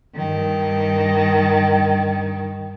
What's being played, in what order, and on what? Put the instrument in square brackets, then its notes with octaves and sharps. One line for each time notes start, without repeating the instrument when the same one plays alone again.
[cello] G2 D#3